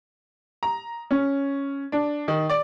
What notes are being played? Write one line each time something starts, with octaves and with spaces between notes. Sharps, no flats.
A#5
C#4
D4
D#3
D5